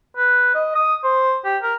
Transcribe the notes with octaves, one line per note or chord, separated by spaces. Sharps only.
B4
D#5
D#6
C5
G4
A#4